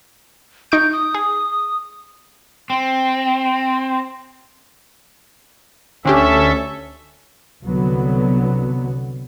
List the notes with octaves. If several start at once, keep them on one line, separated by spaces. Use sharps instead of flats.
D#4 C#6 G6 D7
D#6
G#4
C4
D2 D3 C#4 D4 G4 A4 E5
C2 D3 F#3 B3